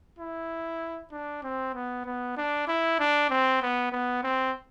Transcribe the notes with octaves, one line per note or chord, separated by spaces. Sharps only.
E4
D4
C4
B3
B3
D4
E4
D4
C4
B3
B3
C4